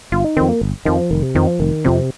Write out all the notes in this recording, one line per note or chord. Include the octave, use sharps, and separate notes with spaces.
G1 F4
D#4
F2 D#3 C4
A#3
G1
F2 D#3 F3
F1 D#3
C3
F2 D#3 F3 C4
F3
F1 D#3
F2 C3 F3 C4